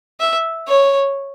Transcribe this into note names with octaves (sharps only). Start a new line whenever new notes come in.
E5
C#5